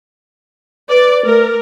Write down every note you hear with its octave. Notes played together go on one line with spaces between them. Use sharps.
B4 D5
A3 A#4